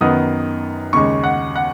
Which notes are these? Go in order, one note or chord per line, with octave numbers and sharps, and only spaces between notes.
F#2 D#3 B3 D#6
D#2 C#3 G#3 C#6
F#5
F#5